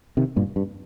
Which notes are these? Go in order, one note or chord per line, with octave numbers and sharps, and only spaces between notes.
C3 D#3
G2 A#2
G2